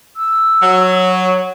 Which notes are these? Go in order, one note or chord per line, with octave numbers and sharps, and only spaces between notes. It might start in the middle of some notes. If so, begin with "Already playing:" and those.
E6
F#3
C#5